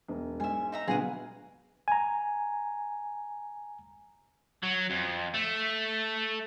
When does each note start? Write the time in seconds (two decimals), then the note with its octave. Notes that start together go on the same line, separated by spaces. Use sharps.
0.08 E1
0.40 G#2 E5 G#5
0.72 D#4 E5 A#5
0.88 G1 B2 G#4 A#4 F#5 D#7
1.88 G#5 A#5
4.63 F#3
4.90 F2
5.35 A3